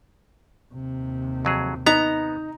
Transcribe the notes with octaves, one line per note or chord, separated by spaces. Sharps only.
D#2 C3
F2 F#3 G#4
B3 D#4 A#5